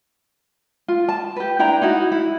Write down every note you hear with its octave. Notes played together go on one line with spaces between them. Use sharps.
F4
A5
G4 B4
D4 E4 G5 A#5
D#4 E4 F#4
E4